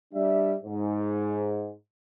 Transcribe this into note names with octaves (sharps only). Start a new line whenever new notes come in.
G3 D4 E5
G#2